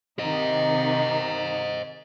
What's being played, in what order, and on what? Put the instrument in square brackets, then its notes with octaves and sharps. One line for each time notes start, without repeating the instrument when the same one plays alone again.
[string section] C3 D#3 D#4 [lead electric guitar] C5 D#5